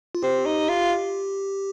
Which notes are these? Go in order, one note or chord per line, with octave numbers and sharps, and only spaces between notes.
F4
C4 G4
D#4
F4